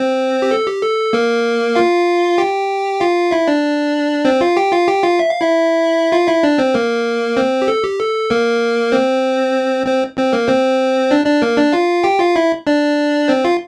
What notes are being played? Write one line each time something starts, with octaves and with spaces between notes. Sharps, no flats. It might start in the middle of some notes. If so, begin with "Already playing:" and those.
Already playing: C4 C5
G4
A4
G4
A4
A#3 A#4
F4 F5
G4 G5
F4 F5
E4 E5
D4 D5
C4 C5
F4 F5
G4 G5
F4 F5
G4 G5
F4 F5
E5
F5
E4 E5
F4 F5
E4 E5
D4 D5
C4 C5
A#3 A#4
C4 C5
G4
A4
G4
A4
A#3 A#4
C4 C5
C4 C5
C4 C5
A#3 A#4
C4 C5
D4 D5
D4 D5
A#3 A#4
D4 D5
F4 F5
G4 G5
F4 F5
E4 E5
D4 D5
C4 C5
F4 F5